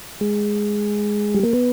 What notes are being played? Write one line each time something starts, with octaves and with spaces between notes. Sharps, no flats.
G#3
G3
A#3
B3